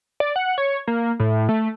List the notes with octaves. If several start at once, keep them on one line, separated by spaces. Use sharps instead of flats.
D5
F#5
C#5
A#3
A2
A3